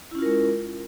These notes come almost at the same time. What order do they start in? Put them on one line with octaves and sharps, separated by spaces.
E4 C#4 F4 A#4 G#3